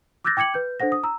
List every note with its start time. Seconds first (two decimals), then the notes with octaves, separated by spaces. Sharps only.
0.25 D6 E6 F#6 G6 A6 A#6
0.37 G5 D6 G#6 C#7 F#7
0.54 B4 G6
0.80 D4 A4 C5 F#5 A#6
0.92 D#6
1.03 A#5 E6